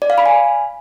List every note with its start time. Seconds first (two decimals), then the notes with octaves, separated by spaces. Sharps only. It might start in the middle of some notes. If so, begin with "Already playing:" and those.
0.02 D5
0.10 F5
0.18 B5
0.26 G#5